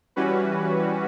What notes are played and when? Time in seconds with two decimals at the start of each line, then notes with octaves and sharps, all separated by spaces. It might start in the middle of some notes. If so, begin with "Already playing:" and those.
0.16 E3 G3 C#4 F#4 B4